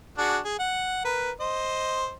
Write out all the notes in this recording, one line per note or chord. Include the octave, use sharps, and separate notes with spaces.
D4 F#4 G#4
G#4
F#5
A#4 B4
C5 D#5